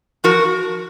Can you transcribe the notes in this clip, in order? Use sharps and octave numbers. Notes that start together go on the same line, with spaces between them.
F3 F#4 A#4